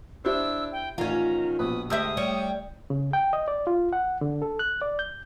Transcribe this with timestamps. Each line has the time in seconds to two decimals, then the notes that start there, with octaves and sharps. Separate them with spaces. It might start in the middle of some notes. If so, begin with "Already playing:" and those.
0.25 D4 E4 G4 C5 E6
0.72 G5
0.98 A1 D#3 C#4 F4 A#5
1.59 A#1 B2 B4 D#6
1.90 D2 G#3 G4 E5 D#6 E6 G6
2.17 G3 C#5
2.90 C#3
3.13 G5
3.33 D#5
3.48 D5
3.67 F4
3.93 F#5
4.21 D3
4.42 A4
4.59 F#6
4.82 D5
4.99 G6